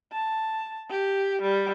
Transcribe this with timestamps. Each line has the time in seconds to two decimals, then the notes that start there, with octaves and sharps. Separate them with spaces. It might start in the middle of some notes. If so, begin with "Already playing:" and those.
0.12 A5
0.90 G4
1.42 G3